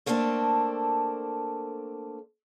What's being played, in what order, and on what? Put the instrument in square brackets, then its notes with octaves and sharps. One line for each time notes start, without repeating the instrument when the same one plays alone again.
[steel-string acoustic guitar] A3 A#3 C4 D4 A4